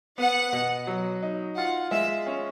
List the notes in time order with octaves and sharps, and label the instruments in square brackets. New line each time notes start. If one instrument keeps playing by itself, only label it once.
[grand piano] B3 [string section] F#5
[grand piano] B2
F#3
D#4
[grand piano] F4 [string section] F#5
[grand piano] G#3 [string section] E5
[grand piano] C#4